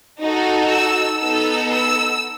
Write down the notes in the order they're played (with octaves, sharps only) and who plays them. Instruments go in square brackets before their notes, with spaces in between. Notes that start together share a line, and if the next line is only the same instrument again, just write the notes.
[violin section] D#4 F#4 A4
E6
B3 D#4 A4 E6
E6